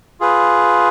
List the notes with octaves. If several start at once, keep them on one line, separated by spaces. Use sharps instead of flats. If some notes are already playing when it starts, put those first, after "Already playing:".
F4 G#4 B4